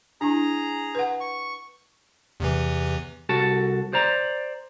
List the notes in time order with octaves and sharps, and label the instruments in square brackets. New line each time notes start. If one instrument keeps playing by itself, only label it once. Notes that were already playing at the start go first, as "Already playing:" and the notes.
[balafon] D4 E4 [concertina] G#4 A#5
[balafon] B4 F#5
[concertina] C#6
[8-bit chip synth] E2 C3 E3
[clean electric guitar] C2 F#4 A4 A5
C5 D5 A#5